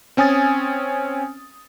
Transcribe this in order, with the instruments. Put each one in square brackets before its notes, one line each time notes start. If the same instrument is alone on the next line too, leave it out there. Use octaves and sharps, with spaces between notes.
[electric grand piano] C4 C#4 G#5 D#6 A6